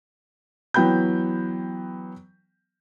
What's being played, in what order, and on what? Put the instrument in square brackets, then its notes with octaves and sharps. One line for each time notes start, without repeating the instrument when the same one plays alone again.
[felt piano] E3 F#3 B3 G5 B5 G6